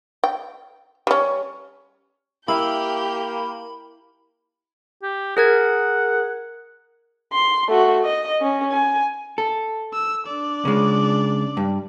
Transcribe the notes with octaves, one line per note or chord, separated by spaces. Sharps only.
G5
G3 C#4
A#3 E4 G4 F5 B5 G6
G4
G#4 A#4 F#5 G#6
C6
A3 F#4
D#5
C#4
G#5
A4
E6
D4 D5
C#3 G#3
G2